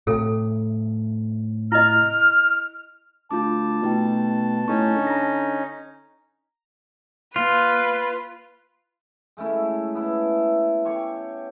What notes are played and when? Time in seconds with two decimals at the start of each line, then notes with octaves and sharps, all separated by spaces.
0.07 A2 C3 G#4 A4
1.72 E4 D#5 F6
3.31 D2 F4 A5 D6
3.82 B2 A3 D#4 G5
4.68 A2 C#4 D#4 C#6
4.95 D3
5.07 A#5 A#6
7.36 A#3 F4 B4
9.37 G#3 A3 C#4 E4
9.95 B3 E4
10.85 G4 C#5 C#6